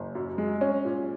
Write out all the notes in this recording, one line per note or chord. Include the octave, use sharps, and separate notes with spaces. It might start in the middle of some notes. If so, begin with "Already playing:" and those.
Already playing: F#1
F#2
G#3
C#4
A#2